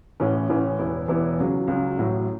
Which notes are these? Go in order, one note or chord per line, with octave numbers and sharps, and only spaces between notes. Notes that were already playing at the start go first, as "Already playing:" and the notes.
A1 A2 E3 C#4
A1 A2 E3 C#4
E1 E2 E3 B3 E4
E1 E2 E3 B3 E4
C#2 C#3 F#3
C#2 C#3 F#3
A1 A2 F#3